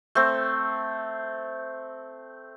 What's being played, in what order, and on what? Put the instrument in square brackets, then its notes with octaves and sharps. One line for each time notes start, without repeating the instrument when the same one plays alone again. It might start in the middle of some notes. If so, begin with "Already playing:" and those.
[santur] A3 C4